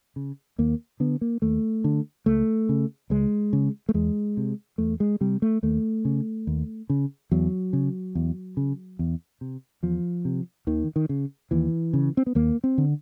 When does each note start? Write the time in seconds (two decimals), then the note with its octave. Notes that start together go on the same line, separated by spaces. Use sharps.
0.16 C#3
0.58 D#2 A#3
1.00 D3 B3
1.21 A#3
1.42 D#2 A3
1.84 D3
2.26 C#2 A3
2.69 C#3
3.10 C#2 G#3
3.53 C#3
3.89 A3
3.94 E2 G#3
4.37 C3
4.78 E2 A3
5.00 G#3
5.21 C3 G3
5.42 A3
5.63 D#2 A3
6.05 C#3
6.47 D#2
6.90 C#3
7.32 E2 F#3
7.73 C#3
8.15 E2
8.57 C#3
8.99 E2
9.41 C3
9.83 E2 F3
10.25 C3
10.67 D#2 D#3
10.96 D#3
11.09 C#3
11.51 D#2 E3
11.93 C#3
12.17 C4
12.26 B3
12.35 D#2 A#3
12.64 C4
12.78 D3